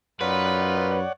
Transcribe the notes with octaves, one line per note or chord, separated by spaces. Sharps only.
F#2 D#4 F4 B4 C#5 D5 F#5